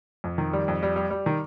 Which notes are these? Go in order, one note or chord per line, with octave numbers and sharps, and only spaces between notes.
F2
D#3
G3
F2
G3
G3
G3
D#3